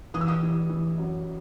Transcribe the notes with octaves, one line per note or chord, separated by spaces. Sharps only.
E3 D#6
E6
D#6
E3
E3
F#2